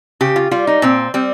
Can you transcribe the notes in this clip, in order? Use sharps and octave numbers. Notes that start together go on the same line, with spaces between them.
C#3 G4
F4
G3 F4
D#4
A#2 C4
G3 C4